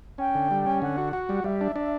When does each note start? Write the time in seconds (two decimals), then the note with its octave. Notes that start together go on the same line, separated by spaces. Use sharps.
0.18 C#4 G5
0.35 D3
0.51 G3
0.66 C#4
0.81 D3 F#5
0.98 F#4
1.13 F#4
1.29 G3
1.44 G3 E5
1.61 D4
1.76 D4